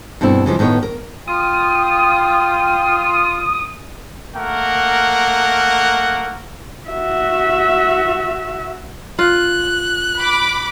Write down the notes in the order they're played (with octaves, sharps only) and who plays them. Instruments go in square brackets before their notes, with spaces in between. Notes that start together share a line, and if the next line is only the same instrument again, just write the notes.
[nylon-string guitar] G2 B2 A3 C4 E4
C#3 E3 F3 G#3
A2 D#3 B3 B4 C#5
A#4
[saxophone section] F4 [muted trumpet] G5 [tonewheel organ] D#6
[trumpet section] A3 A#3 A#4 F#5
[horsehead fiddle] F#4 E5
[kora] F4 [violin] F#6
[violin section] B5 D6